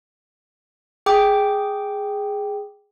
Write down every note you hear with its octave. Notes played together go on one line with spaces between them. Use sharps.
G#4 G5 D6